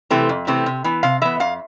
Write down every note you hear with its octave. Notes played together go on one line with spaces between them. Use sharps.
C3 E3 A3 C4
F2
C3 E3 A3 C4
C3
E3 B3
C3 F5
E3 B3 E5
F2 F5